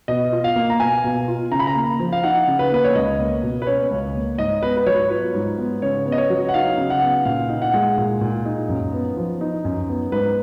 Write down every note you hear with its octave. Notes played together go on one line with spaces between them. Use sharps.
B2 D#5
F4
F5
A#3
A#5
B2 G#5
B2
F4
C#3 A#5
B5
A#5
A#3
F3
F5
D#4 F#5
C#3
B4
A#3 B4
C#5
C#2 D#5
A#3
B2
B4
C#4 C#5
C#2
A#3
G#2 D#5
B3 B4
B4
F#3 C#5
F4 B4
G#2
B3
C#3 C#5
B3
D#5
C#5
F#3
F#5
D#4 F5
C#3
F#5
B3
A#2 F5
D#4
F#5
G#3
A#2
A#2
D#4
F#2
B3
F3
D#4
F#2
B3
G#2 B4